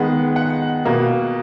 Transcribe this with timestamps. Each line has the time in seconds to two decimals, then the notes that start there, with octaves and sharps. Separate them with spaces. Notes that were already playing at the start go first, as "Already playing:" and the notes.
Already playing: D#3 G#3 B3 F#5
0.36 F#5
0.85 B2 A#3